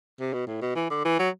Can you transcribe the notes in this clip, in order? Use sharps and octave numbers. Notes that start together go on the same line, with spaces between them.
C3
B2
A2
B2
E3
D3
E3
F#3